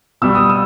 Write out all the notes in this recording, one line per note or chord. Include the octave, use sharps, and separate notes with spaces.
B2 G3 E6
D#6
E6